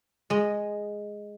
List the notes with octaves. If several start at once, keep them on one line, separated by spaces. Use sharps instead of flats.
G#3 D#5